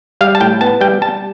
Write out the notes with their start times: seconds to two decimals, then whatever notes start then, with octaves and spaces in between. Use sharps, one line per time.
0.21 G3 F5
0.35 A5
0.40 A2 G5
0.61 B3 A5
0.81 G3 G5
1.02 G3 A5